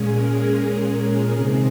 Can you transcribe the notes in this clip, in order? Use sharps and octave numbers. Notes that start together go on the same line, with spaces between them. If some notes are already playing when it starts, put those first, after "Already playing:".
Already playing: A#2 G#3 C#4 G#4
A#4
C3 D#3 G#3 C4 G#4